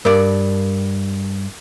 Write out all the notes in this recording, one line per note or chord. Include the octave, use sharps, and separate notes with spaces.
G2 A#4 D5